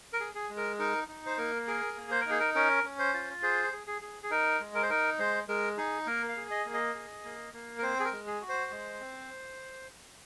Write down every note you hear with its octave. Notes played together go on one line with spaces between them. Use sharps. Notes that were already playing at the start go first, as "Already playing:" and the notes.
A#4
G#4
G#4
G#3
A#4
D#4 A#4
D#4
C5
A#3 A#4
G#4 A#4
A#3
C5
A#4
D#4 G#4
A#4
C#4 A#4
C#4
C5
F4
G#4 C5
G#4
G#4
G#4
G#4
D#4 A#4
G#3
A#4
C5
D#4 A#4
G#3 C5
G#3 A#4
D#4 G#4
A#3 A#4
F5
G#4
D#5
A#3
D#5
G#4
A#3
A#3
A#4
C4 C5
G#4
A#4
G#3
G#4
F#4
C5
G#3
C4